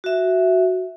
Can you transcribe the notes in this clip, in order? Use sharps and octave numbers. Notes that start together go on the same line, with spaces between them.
F#4 E5